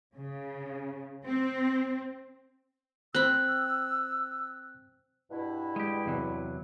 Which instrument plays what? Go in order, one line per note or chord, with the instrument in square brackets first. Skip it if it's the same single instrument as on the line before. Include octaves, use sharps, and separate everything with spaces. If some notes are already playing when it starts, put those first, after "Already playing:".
[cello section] C#3
C4
[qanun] C4 B5 [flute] E6 [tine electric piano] F#6
[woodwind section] G2 B2 E4
[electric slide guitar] G#3 G4
E2 C3 F#3